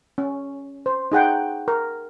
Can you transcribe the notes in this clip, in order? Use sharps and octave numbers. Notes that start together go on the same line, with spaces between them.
C#4
C5
D#4 G#4 F#5 G5
A#4